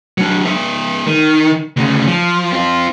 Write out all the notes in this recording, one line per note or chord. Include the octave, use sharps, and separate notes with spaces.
F#3 D4
G#3 E5
D#3
D2 C#3
F3
C4 F4